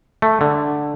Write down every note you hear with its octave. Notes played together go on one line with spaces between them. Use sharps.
A3
D3